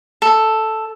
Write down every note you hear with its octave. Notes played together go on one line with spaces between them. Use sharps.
A4